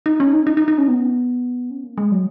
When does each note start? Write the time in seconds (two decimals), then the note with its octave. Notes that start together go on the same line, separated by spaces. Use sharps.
0.06 D#4
0.20 C#4
0.33 D#4
0.47 D#4
0.57 D#4
0.68 D#4
0.78 C#4
0.88 B3
1.70 C#4
1.84 A#3
1.98 G#3
2.11 F#3